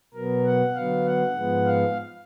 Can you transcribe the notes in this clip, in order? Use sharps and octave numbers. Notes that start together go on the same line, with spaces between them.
B2 F#3 B3 A#4
F#5
D3 F#3 B3 F5
F#5
G#2 F3 G#3 B3
F5